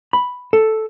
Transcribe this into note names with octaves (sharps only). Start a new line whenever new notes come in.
B5
A4